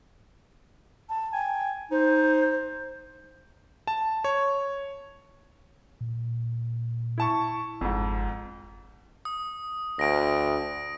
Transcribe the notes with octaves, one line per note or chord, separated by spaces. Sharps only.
A5
G5 G#5
D#4 C5
A5
C#5
A#2
E4 A5 C#6
G1 F2 G#2
D#6
D2 A#6 D7